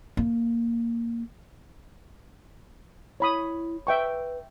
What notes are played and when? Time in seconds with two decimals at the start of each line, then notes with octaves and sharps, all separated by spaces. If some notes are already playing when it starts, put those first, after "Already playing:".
0.17 A#3
3.20 E4 C#5 B5 D#6
3.87 B4 E5 G5 C#6